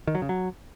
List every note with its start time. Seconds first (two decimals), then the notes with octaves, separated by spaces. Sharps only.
0.07 D#3
0.15 F#3
0.22 C#3
0.29 F#3